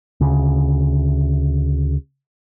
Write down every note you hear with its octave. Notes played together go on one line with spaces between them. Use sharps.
D2 C#3